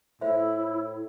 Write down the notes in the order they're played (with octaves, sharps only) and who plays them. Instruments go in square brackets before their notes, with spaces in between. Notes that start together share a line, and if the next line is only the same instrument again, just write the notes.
[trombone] A2 [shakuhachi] E4 [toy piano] F4 C5 E5